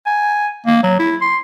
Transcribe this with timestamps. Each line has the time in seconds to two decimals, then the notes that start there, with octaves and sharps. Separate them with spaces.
0.06 G#5
0.66 A#3
0.83 F#3
0.99 E4
1.21 C6